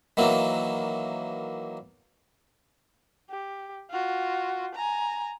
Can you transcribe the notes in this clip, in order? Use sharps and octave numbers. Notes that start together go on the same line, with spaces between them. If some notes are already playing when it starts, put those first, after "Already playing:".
D#3 E3 F#3 A#3
G4
F4 F#4
G#5 A#5